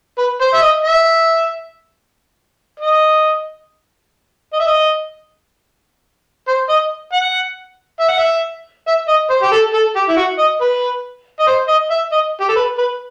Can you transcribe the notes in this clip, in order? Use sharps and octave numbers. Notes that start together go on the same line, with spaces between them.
B4
C5
E5
D#5
E5
D#5
D#5
E5
D#5
C5
D#5
F#5
E5
F#5
E5
E5
D#5
C5
G4
A4
A4
G4
E4
F#4
D#5
B4
D#5
C5
D#5
E5
D#5
G4
A4
B4
B4